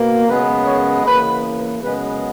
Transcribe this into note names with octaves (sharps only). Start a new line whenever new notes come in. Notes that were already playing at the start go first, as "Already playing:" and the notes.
Already playing: B2 A#3
F#2 C#3 G#3 B3 B4
C#5
C#3 E3 A#3 B4
F#2 C#3 G#3 B3 B4